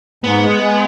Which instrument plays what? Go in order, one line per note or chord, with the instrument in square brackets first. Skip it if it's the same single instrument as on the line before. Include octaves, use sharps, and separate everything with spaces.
[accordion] G#2 [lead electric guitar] B3
[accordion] G#3
G#3